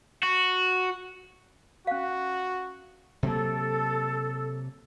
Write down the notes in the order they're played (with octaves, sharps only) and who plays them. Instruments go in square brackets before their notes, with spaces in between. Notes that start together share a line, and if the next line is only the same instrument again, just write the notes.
[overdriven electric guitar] F#4
[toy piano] C#4 F5 [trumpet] F#4
[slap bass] C3 F#3 A#3 [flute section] A4